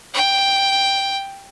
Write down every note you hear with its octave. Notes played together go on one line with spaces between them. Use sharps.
G5